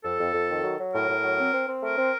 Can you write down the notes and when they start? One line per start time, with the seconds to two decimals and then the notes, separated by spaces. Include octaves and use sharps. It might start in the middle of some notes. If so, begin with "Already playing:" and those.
0.04 F2 A4
0.19 F2
0.34 F2
0.49 D#3
0.64 F#3
0.79 F#3
0.94 A2 A#4
1.09 A2
1.23 F#3
1.39 C4
1.53 C4
1.68 C4
1.83 A3 A#4
1.98 C4